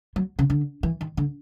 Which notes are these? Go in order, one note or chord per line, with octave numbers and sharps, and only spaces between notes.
F#3
C#3
D3
E3
D#3
D3